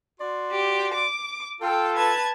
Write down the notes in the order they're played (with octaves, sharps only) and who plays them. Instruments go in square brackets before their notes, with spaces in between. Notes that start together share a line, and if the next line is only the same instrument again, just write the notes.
[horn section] F#4 D5 C6
[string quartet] G4
D6
[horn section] F4 A4 [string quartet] G5
[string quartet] B4 A5 G#6